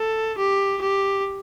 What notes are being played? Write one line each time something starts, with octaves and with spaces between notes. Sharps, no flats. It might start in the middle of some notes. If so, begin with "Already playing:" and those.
Already playing: A4
G4
G4